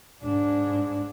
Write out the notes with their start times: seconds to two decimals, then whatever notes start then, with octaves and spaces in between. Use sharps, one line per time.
0.23 G#2 D4